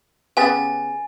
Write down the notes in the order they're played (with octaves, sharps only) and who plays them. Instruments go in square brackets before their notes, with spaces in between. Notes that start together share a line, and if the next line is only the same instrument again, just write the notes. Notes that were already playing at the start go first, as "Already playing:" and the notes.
[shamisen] C#3 B3 G4 [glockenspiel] G#5 A6